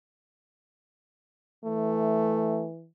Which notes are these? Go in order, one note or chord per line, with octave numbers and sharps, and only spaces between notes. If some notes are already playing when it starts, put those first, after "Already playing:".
E3 A3